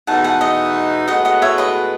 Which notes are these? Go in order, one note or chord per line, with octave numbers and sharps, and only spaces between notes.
E2 B2 A3 D#4 F#5 A5
F#5 A5
D#5 F#5
A2 G#3 B3 F#4 D#5 F#5
D#5 F#5
C#5 E5
B4 D#5